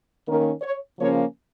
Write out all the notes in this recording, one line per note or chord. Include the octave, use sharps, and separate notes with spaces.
D#3 A#3 C#4 A#4
C#5
C#3 F3 A#3 C#4 C#5